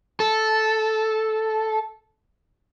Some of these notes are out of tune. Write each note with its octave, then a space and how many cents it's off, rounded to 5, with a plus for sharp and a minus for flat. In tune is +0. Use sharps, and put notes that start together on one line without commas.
A4 -5